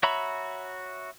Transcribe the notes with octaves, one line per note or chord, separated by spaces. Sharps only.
F#4 C#5 E5 A#5 B5